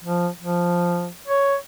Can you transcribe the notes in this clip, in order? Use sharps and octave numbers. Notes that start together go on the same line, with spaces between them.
F3
F3
C#5